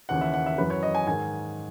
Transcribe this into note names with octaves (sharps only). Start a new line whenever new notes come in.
D#2 C#3 E3 F#5
E5
F#5
E5
F#2 E3 B4
C#5
D#5
G#5
G#2 D#3 G#5